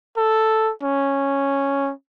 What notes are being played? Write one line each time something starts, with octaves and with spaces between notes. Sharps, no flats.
A4
C#4